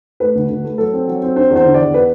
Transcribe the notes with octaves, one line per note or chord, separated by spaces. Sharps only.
A3 B4
D2
D2
A3
F#3 A4
C4
F#3
C4
D4 C5
E2
C5
D3
D5
E2
B3 B4